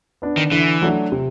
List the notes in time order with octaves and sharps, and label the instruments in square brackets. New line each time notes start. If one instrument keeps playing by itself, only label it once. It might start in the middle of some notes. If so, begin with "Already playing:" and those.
[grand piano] B3 D4
[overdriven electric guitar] D#3
[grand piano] D3 [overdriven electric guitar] E3
[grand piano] F#3 A3 D4 F#4
C3